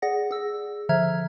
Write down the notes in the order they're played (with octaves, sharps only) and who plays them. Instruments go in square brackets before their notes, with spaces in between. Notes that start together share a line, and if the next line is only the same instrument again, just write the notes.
[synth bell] G#4 D5 F#5 A#6
G#4 E6
D3 F3 E5 A#5 F6 G#6